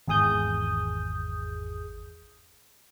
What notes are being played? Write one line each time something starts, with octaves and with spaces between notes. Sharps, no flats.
G#1 E2 G#4 D#6 G6